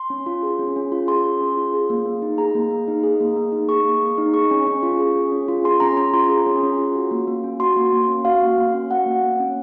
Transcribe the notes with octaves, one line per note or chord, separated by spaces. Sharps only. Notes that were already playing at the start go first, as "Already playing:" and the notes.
Already playing: C6
C#4
F4
G#4
C#4
C#4
F4
G#4 C6
C#4
C#4
F4
G#4
A#3
A#3
D#4
G#4 A#5
A#3
A#3
D#4
G#4
A#3
A#3
D#4
G#4 C#6
A#3
A#3
D#4
G#4 C#6
C#4
C#4
F4
G#4
C#4
C#4
F4
G#4 C6
C#4 A#5
C#4 A#5
F4 C6
G#4
C#4
C#4
F4
F#4
A#3
A#3
C#4
F#4 C6
A#3
A#3
C#4
F#4 F5
A#3
A#3
C#4
F#4 F#5
A#3
A#3
C#4